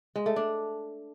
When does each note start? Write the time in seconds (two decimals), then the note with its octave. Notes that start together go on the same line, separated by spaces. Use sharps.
0.16 G#3
0.26 A3
0.36 D4